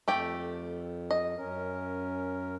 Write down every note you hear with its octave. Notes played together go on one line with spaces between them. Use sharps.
F2 A3 G4 G5
D#5
F#2 C#4 A#4